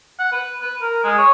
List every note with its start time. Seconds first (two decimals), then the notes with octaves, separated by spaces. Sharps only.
0.19 F#5
0.32 B4
0.61 B4
0.82 A#4
1.03 G#3
1.18 C#5